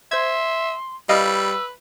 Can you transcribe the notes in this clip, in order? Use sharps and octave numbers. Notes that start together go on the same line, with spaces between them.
C5 E5 C6 G#6
G3 B4 D#5 F5 E6